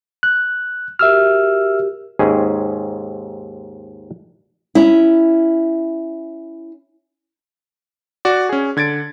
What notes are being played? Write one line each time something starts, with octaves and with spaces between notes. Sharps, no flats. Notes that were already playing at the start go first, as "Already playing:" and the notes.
F#6
F#4 G4 A#4 E5 E6 F6
D#2 G#2 C4 C#4 G#4
C#4 E4
F#4 D5
C#4 G#4
D3 G#6 A6 D7